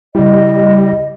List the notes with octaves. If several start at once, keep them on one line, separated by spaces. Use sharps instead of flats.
C#3 G3 E4 D#5